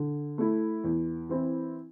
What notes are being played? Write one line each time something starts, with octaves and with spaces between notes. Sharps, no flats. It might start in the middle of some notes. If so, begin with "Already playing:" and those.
Already playing: D3
A3 E4
E2
E3 C4 E4